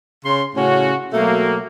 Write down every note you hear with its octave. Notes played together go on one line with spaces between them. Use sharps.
C#3 C#4 C6
A2 C#3 C#4 F#4
B2 F#3 A3 A#3